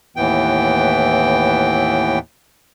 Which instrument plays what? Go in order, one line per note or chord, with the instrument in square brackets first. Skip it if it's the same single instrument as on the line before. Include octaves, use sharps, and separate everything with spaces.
[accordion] D#2 A2 E3 B3 G5